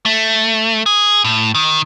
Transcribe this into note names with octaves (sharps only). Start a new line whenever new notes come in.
A3
G#4
A2
D#3